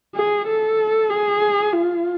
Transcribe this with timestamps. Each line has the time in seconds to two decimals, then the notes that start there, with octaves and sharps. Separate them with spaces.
0.16 G#4
0.48 A4
1.10 G#4
1.73 F4